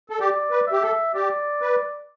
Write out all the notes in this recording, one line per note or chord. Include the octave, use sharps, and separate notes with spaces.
A4
G4 D5
B4
G4 E5
A4
G4 D5
B4